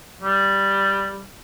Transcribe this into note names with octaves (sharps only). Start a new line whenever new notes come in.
G3